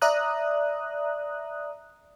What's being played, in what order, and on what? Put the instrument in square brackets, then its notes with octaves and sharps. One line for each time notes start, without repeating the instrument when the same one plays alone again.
[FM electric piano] D5 E5 A#5 D#6 F#6